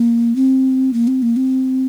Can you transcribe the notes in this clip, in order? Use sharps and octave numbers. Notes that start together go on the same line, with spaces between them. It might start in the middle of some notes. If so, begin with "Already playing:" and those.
Already playing: A#3
C4
A#3
C4
A#3
C4